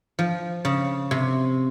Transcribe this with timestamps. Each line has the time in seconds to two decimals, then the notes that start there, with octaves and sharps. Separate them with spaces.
0.19 F3
0.65 C#3
1.11 C3